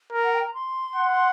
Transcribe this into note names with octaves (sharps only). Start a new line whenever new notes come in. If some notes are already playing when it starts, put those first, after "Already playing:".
A#4
F#5
G5
A#5
C6
F#5